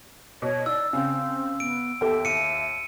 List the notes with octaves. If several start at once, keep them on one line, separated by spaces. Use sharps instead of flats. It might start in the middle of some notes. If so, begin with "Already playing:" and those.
B2 C#5
D#4 D5 E6
C#3 C4
B3 D7
D#2 B3 G4 A4 E5
D#2 C#7 D#7